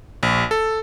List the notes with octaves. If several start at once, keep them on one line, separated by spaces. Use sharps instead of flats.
A#1
A4